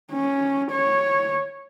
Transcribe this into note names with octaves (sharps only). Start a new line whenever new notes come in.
C#4
C#5